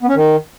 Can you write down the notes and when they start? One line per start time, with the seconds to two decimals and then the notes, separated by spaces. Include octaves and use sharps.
0.02 B3
0.09 C#4
0.16 D#3